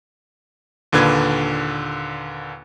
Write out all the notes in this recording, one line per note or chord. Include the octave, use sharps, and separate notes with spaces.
D#2 A#2 D3 B4 G#6